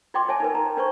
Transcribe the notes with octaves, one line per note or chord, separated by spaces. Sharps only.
F4 D5 D#5 G5 C6 D6
C#5 E5 G#5 A5
D#4 A#4 B4
D#4 A#5
D4 B4 C5 D5 C#6